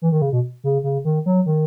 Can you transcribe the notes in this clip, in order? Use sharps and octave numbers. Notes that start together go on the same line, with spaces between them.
E3
D#3
C#3
B2
C#3
C#3
D#3
F#3
D#3